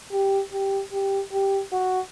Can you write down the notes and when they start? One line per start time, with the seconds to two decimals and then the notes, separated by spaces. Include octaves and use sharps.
0.11 G4
0.52 G4
0.92 G4
1.32 G4
1.72 F#4